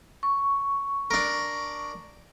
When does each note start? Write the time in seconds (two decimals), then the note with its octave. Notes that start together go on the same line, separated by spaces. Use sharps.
0.23 C#6
1.11 D4 A#4